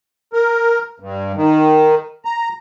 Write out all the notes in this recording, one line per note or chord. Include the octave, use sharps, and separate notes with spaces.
A#4
G2
D#3
A#5